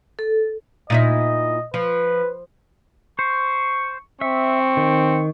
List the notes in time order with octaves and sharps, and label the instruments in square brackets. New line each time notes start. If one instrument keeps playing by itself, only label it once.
[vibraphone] A4
[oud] A#2 D#4 E4 [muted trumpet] D#5
[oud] F3 [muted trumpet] B4
[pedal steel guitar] C5 [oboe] C#6
[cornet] C4 [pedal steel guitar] E5 [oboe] C#6
[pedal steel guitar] D#3